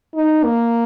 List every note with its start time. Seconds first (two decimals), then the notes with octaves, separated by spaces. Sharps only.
0.14 D#4
0.44 A#3